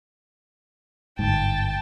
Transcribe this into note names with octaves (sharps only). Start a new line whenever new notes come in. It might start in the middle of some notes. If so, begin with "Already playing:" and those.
G1 G#2 G5 A5